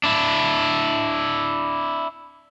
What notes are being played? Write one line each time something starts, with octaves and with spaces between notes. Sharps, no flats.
D4 E4